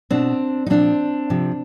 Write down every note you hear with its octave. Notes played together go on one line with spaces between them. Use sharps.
B2 C4 D4
D#4
A#2 F3 C4 D4
C3 F3